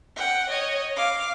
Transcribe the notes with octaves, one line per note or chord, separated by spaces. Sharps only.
F#5 G5
C#5 D#5
F5 D6